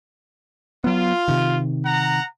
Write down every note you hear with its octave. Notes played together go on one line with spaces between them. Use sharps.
F#3 B3 F4
C3 D#3
F#5 A#5